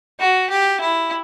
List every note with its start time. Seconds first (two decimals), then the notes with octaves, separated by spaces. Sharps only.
0.20 F#4
0.50 G4
0.81 E4